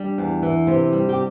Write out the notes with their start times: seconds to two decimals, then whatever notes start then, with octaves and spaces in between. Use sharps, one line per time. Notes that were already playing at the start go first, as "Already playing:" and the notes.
Already playing: G3 D4
0.18 E2
0.42 E3
0.67 C3
0.93 G3
1.09 G4